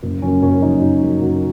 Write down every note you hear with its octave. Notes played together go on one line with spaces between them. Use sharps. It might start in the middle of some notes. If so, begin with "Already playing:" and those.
F#1
F#2 F#3 C#4
F#1 C#4
F#2 F#3 D#4
F#1 D#4
F#2 F#3
F#1 F#4